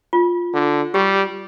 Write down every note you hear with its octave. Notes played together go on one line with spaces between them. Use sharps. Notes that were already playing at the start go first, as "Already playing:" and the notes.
F4
D3
G3 G4